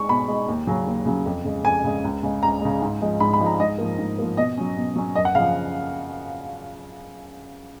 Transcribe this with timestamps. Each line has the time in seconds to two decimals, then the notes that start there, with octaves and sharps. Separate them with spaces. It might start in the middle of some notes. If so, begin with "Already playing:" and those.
Already playing: G#3 D#4 C#6
0.09 B2 B5
0.28 G#3 D#4
0.48 D#2
0.67 C#3 F#3 C#4
0.87 D#2
1.06 C#3 F#3 C#4
1.26 F2
1.45 C#3 G#3
1.64 F2 G#5
1.84 C#3 G#3
2.04 C#2
2.23 C#3 G#3
2.43 C#2 A#5
2.61 C#3 G#3
2.82 G#2
3.01 F3 G#3 D#4
3.20 G#2 B5
3.33 B5
3.40 F3 G#3 D#4
3.46 A#5
3.60 G#2 D#5
3.78 F3 A#3
3.98 G#2
4.19 F3 A#3
4.37 B2 D#5
4.57 F#3 C#4
4.77 B2
4.96 F#3 C#4
5.15 F#2 D#5
5.25 F#5
5.35 C#3 F5
5.38 F3